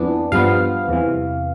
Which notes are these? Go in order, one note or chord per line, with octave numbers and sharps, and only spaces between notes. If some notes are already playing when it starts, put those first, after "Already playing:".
Already playing: F2 E3 B3 D4
G2 F3 B3 F5
E2 C3 E3